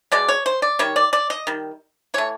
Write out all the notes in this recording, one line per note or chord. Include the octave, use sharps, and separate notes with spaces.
B2 G#3 D5
C#5
C5
D5
D#3 G3 C#5
D5
D5
D#5
D#3 G3
E3 A3 C#5